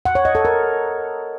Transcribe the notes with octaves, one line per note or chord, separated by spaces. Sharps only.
F#5
C#5
D#5
A4
A#4